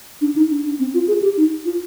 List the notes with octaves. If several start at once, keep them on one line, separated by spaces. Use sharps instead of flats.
D4
D#4
D4
D4
C4
F4
G#4
G4
D#4
F4